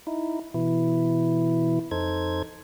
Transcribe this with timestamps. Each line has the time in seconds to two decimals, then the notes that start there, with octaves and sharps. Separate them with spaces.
0.07 D#4 E4
0.54 B2 E3 E4
1.91 F2 D#4 A4 C5 G#6